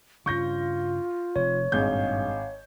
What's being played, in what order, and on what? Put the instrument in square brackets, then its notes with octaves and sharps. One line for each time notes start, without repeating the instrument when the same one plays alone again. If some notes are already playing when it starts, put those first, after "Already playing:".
[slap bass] G2 C#3 [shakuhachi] F4 [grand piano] C#6 G6 A#6
[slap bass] F1 [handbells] C#5
[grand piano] G#1 G#3 G6 [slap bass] G2 A#2 G3 [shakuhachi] F5